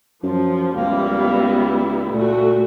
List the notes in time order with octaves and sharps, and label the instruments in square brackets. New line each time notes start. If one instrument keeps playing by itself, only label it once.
[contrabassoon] F#2 [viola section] F3
[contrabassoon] C#2 [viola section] G3 B3 E4 [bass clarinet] A#3
[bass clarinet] A#2 [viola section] A3 F#4